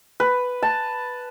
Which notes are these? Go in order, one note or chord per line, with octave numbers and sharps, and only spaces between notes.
B4
A5